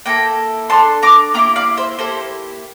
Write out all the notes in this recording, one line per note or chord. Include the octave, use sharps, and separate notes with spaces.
A#3 E4 A4 G5 A#5
D4 A4 A5 C6
A#5 D6
A#3 E4 G4 A#5 D6
D5 F5
C5 E5
A#3 E4 G4 A4 C5